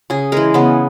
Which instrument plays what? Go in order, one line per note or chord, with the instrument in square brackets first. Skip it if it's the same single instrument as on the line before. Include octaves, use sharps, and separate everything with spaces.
[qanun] C#3 G#4
E3 G#3 A#4
C#3 B3